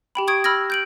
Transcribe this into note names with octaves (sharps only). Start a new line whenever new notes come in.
G4 G5 B5
C#6 D#6 G#6 D7
B5 E6 F6 G#6 A#6
G6 D7 F#7